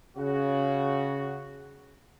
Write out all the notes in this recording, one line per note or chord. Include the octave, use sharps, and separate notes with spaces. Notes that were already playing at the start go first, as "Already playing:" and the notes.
C#3 F#4